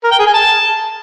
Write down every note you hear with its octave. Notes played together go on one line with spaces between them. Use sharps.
A#4
G5
G#4
G#5
A5